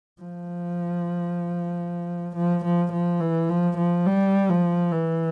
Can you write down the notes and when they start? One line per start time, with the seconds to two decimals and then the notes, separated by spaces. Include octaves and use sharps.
0.22 F3
2.35 F3
2.64 F3
2.92 F3
3.20 E3
3.49 F3
3.77 F3
4.06 G3
4.49 F3
4.91 E3